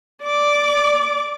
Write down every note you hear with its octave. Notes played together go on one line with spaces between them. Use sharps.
D5 D6